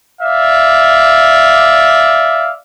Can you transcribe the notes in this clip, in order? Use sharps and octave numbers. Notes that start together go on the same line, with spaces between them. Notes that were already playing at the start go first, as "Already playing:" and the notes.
D5 E5 F5